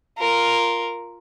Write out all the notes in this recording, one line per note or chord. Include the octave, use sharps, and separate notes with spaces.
F4 A#4